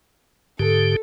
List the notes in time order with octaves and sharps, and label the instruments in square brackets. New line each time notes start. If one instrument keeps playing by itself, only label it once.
[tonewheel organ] G#2 D3 G4 [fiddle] A4